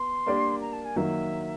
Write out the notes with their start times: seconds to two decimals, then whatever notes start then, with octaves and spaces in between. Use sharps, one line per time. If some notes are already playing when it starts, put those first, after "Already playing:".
Already playing: B3 C6
0.26 A#3 D4 G4 A#4 D5
0.61 A#5
0.73 A5
0.85 G#5
0.96 D#3 F#3 A#3 E5